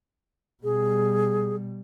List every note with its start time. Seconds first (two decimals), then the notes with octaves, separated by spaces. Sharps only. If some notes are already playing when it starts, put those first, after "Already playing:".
0.64 B2 G3 G#4